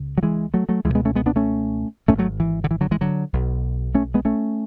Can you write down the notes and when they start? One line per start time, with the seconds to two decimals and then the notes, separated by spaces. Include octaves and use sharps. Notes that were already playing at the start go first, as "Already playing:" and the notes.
Already playing: C#2 C#3
0.18 F#3
0.23 E3 G#3
0.54 F#3 A3
0.69 F#3 A3
0.84 C#2 E3 G#3
0.89 B2
0.95 G#3 B3
1.05 A3 C#4
1.15 G#3 B3
1.26 B3 D4
1.36 A3 C#4
2.08 G#2 A3 C#4
2.12 G#1
2.18 F#3 A3
2.40 E3
2.64 D3
2.71 E3
2.81 D3 F#3
2.91 E3 G#3
3.01 D3 F#3
3.33 B1 B2
3.95 A3 C#4
4.14 G#3 B3
4.25 A3 C#4